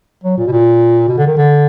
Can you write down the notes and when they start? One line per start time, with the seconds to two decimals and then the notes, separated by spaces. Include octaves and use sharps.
0.24 F#3
0.37 A#2
0.47 B2
0.52 A#2
1.08 B2
1.18 D3
1.27 D#3
1.37 D3